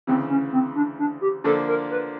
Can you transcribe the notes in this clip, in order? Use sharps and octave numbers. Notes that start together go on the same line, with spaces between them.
D2 C#3 E3 C4
C#4
C4
D4
D4
G4
D3 F3 A#3 D4 A4
A#4
B4